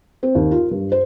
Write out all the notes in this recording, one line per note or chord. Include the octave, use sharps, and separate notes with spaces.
C4
D#2
F4
G2
C5